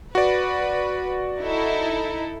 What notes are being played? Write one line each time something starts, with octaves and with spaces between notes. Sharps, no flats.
F#4 B4 D5
D#4 E4 A4